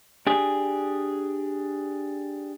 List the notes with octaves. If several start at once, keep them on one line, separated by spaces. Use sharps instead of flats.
D4 G4 G#4